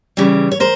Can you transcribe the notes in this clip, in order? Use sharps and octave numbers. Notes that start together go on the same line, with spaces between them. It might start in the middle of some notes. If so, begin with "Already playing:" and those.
C#3 E3 G3
C#5
A#4 C5